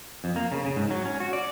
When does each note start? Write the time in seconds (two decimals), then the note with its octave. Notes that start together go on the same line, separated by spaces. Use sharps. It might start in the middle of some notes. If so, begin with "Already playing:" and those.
0.24 F2
0.36 A#3
0.52 C#3
0.64 C#3
0.76 G#2
0.90 F#3
1.05 C#4
1.20 F#4
1.33 D5